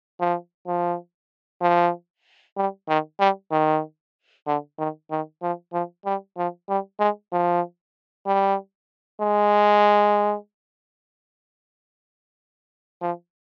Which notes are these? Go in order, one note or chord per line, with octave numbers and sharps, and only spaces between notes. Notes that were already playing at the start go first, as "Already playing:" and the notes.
F3
F3
F3
G3
D#3
G3
D#3
D3
D#3
D#3
F3
F3
G3
F3
G3
G#3
F3
G3
G#3
F3